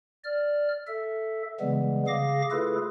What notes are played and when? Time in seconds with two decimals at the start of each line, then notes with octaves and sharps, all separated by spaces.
0.24 D5 F6
0.87 A4 E5
1.60 C#3 E3 G3 G#3 B3
2.07 C#3 G#4 F5 D6 A#6
2.51 A3 E4 F4 G#4 A4 B4